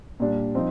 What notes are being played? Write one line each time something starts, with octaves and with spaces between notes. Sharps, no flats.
A#2 G3 D4
F3 C4 D#4